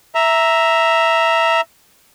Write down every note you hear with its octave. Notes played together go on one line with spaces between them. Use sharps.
E5 A#5